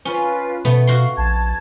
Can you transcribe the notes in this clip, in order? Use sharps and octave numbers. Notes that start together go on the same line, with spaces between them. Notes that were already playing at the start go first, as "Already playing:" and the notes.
C#4 F4 B4
B2 A3 B3
F#4 F5 C6
A#1 A5 G#6